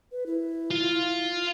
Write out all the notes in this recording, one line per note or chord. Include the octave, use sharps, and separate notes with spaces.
B4
E4
F4